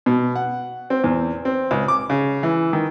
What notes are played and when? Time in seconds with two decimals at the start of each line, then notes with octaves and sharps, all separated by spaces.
0.06 B2
0.36 F#5
0.90 C4
1.04 E2
1.45 C4
1.71 C#2
1.88 D6
2.10 C#3
2.43 E3
2.73 D#3